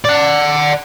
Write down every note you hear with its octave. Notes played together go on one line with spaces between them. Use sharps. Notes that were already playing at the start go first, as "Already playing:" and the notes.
D5 F#5